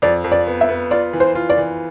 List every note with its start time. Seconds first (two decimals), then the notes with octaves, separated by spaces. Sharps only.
0.02 F2 D5
0.24 F2
0.32 D5
0.47 B3
0.61 E5
0.69 B3
0.91 F4 D5
1.13 E3
1.20 C5
1.35 F4
1.50 D5
1.57 E3